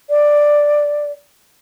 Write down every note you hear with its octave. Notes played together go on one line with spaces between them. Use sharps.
D5